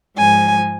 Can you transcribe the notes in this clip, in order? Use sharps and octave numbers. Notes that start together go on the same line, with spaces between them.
G#2 F3 G#3 G#5